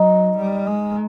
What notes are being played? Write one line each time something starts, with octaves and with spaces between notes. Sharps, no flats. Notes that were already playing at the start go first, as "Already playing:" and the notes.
Already playing: F#3 D#4
G3
G#3